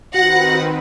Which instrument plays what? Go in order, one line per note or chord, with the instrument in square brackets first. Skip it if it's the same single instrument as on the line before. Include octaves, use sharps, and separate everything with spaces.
[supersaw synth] D#3 C4 B4 [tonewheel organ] F#4 [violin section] F#5 [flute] A#6